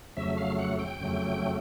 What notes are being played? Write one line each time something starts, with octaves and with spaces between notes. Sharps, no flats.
F2 C#3 F#3 A3 E5
F5
F#5
G5
F2 C#3 F#3 A3